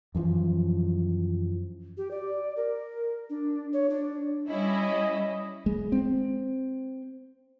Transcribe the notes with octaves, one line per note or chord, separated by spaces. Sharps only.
F#2 E3 F3
G4
D5
A#4
D4
C#5
D4
G3 C#4 E4 D#5
G#3
C4